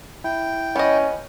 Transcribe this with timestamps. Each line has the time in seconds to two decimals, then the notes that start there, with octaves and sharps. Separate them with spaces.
0.24 E4 G5
0.76 B3 C#4 D#5